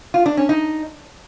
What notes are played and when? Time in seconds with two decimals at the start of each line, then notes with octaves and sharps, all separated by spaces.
0.14 F4
0.26 D4
0.37 C#4
0.49 D#4